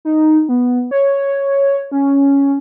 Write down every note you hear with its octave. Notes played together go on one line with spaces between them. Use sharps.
D#4
B3
C#5
C#4